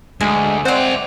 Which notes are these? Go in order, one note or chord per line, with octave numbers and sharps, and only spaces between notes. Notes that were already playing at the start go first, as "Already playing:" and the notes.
D2 G#3 G#5
C4 C5 D5 F#5 C6